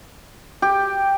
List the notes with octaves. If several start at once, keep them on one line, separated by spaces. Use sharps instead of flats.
G4